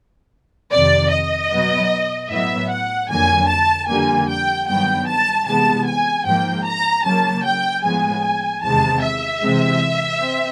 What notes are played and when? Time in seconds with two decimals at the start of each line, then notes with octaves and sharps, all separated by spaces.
0.72 F2 C3 D#3 D5
1.11 D#5
1.51 B2 F#3 B3
2.30 A2 F#3 B3 E5
2.70 F#5
3.09 F2 D3 F#3 A#3 G#5
3.49 A5
3.88 F2 D3 G3 A#3 G#5
4.28 G5
4.67 G2 D#3 F#3 B3 G5
5.07 A5
5.46 C3 E3 G#3 B3 A5
5.86 G#5
6.25 G#2 F3 A#3 G5
6.65 A#5
7.04 C#3 F#3 A#3 A5
7.44 G5
7.84 A2 F3 G#3 B3 G#5
8.63 E2 C3 D#3 G#3 A5
9.02 E5
9.42 C3 E3 G#3 C4
10.21 C4